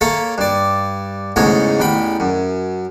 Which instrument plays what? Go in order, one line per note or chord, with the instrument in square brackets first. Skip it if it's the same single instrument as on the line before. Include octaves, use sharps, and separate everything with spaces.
[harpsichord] A#3 A4 C#5 E5
G2 D5
E2 G#2 C#3 A3 C#5 D#5
A1 E2 G5 B5
F#2